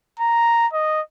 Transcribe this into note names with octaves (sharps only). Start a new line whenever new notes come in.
A#5
D#5